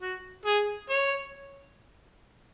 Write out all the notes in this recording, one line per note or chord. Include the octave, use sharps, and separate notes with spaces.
F#4
G#4
C#5